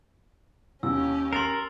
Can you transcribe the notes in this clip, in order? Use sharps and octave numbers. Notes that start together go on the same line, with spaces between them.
D#2 C#4 G4 E6
A#4 C6 A6 C7 E7